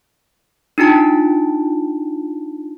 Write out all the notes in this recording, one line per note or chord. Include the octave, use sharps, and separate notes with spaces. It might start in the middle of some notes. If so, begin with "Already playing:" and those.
D4 D#4 F4 A5